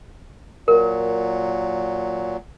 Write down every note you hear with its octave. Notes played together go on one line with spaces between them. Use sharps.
A#2 F#3 A#4